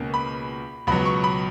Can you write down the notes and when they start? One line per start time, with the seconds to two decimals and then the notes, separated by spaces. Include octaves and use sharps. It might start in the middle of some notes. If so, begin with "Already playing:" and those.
Already playing: C#2 B2 A#3 C#4
0.14 B5
0.87 C#2 B2 F#3 B5
1.05 C#6
1.24 B5